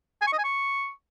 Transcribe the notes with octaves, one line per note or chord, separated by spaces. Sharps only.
G#5
C#6
D#5
G#5
C#6